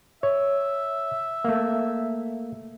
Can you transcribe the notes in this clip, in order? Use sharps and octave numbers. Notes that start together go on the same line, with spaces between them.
C#5 E5
A3 A#3